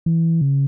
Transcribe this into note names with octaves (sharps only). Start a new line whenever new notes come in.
E3
C#3